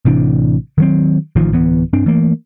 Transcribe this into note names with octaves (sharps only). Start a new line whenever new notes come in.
A1 C3 E3 D4
D#3 F#3 C4
A1 D#3 F3
D1 E3 B3
G2 C4 D4
E3 A3 A#3